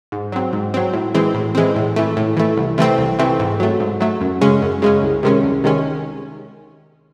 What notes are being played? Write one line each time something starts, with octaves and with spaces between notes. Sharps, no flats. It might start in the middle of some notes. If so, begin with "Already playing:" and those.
G#2
F#3 C4
G#2
F#3 C4
A2
E3 G#3 C4
A2
E3 G#3 C4
A2
E3 A3
A2
E3 A3
C2
C3 E3 A3 C4
C2
C3 E3 A3 C4
G#2
F#3 A3
G#2
F#3 A3
F#2
C#3 G#3 C#4
F#2
C#3 G#3 C#4
C2
C3 D#3 G#3 C#4
C2
C3 D#3 G#3 C#4